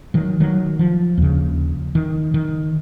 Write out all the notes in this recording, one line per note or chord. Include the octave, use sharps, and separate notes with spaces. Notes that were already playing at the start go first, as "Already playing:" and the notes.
D#3 F#3
D#3 F#3
F3
D#2 C#3
D#3
D#3